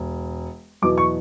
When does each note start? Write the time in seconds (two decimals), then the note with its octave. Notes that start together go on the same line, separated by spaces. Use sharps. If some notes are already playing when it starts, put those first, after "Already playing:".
Already playing: E1
0.82 E2 B2 F#3 D6
0.98 C#6